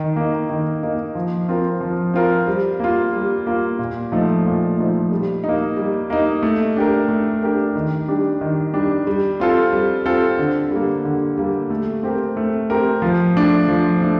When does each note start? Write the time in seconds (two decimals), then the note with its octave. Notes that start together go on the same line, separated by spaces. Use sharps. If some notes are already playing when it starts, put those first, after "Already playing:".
Already playing: D#3
0.16 A#3 D#4
0.50 D#3
0.83 A#3 D#4
1.15 F3
1.48 C4 F4 A#4
1.81 F3
2.14 C4 F4 A#4
2.47 G3
2.80 A#3 F4
3.13 G3
3.47 A#3 F4
3.79 A#2
4.12 F3 A3 D#4
4.46 A#2
4.78 F3 A3 D#4
5.12 G3
5.44 A#3 D#4
5.77 G3
6.10 A#3 D#4
6.43 A3
6.77 D4 G4 A#4
7.08 A3
7.43 D4 G4 A#4
7.75 D#3
8.08 G3 D4 G4
8.41 D#3
8.74 G3 D4 G4
9.07 G3
9.40 C4 F4 A4
9.73 G3
10.05 C4 F4 A4
10.39 D3
10.71 G3 A#3
11.05 D3
11.38 G3 A#3
11.70 A3
12.03 C4 G4 A#4
12.37 A3
12.70 C4 G4 A#4
13.02 F3
13.36 A3 D4
13.68 F3
14.02 A3 D4